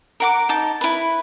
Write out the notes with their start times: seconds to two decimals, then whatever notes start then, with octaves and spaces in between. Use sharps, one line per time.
0.20 A#4 F#5 D6
0.49 D#4 A5
0.81 E4 B4